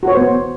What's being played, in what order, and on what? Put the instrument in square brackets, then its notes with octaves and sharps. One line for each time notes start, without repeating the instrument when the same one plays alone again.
[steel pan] F#4
C#5
C5
B3